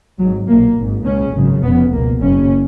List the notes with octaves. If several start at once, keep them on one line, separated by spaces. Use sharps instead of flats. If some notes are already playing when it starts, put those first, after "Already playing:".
G#1 G#2 F#3
B1 A#2 A#3
G#1 G#2
C#2 C#3 C#4
G#1 F#2 C#3
F1 F2 C#3 B3
C#2 B2 A#3
F#1 F#2 C#3 C#4